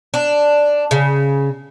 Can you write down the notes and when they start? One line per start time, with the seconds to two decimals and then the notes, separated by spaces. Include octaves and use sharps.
0.14 D4
0.91 C#3